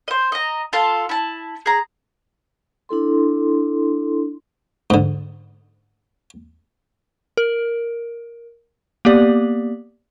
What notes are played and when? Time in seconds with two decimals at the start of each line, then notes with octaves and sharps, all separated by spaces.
0.08 C5 D#5
0.32 D#5 A#5
0.73 F4 A4 A5
1.09 E4 A5
1.66 G#4 A#5
2.89 D4 E4 A4 C6
4.90 G#2 D3
7.37 A#4
9.05 A#3 B3 G4 D5